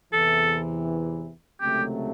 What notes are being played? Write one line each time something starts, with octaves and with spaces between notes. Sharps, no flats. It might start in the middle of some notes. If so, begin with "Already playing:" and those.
E2 C3 E3 A4
C#2 C3 D#3 F#3 A3 G4